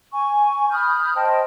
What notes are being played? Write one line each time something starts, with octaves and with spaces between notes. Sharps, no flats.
G#5 C#6
B5 D#6 F6 G6
C5 D#5 G5 A5